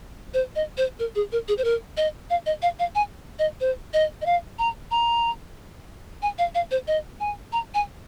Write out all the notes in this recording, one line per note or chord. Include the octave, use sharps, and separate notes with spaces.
C5
D#5
C5
A#4
G#4
A#4
G#4
C5
A#4
D#5
F5
D#5
F5
F5
G#5
D#5
C5
D#5
D#5
F5
A#5
A#5
G#5
F5
F5
C5
D#5
G#5
A#5
G#5